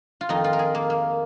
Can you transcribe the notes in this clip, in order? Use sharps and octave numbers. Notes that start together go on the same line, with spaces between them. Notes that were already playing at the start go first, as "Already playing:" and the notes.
F4
F2 D#3 D#4
F4
A#4
G#4
A#3
A#3